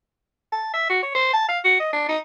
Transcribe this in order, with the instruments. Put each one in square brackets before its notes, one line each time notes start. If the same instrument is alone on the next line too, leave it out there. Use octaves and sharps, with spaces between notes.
[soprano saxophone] A5
E5
F#4
C#5
C5
A5
F5
F#4
D#5
D4
D#4